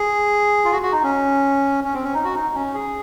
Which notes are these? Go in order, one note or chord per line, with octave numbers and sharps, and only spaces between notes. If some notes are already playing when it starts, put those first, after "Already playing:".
Already playing: G#4
F4
F#4
F#4
D#4
C#4
C#4
C4
C#4
D#4
F#4
D#4
C#4
G#4